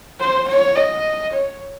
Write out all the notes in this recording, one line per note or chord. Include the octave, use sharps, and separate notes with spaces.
C5
C#5
D#5
C#5